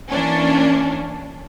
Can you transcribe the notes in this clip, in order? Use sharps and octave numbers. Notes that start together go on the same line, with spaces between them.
E3 A#3 C#4 D4